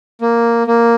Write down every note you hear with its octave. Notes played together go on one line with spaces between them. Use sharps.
A#3
A#3